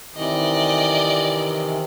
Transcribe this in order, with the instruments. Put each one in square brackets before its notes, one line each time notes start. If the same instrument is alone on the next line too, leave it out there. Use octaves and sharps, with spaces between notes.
[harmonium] C3 D#3 E3 [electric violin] D5 D#5